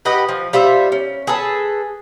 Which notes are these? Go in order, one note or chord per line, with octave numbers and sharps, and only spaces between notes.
G4 B4 D#5 F#5
F3
G3 F4 C5 E5
C#4
G#4 A4 B4 A5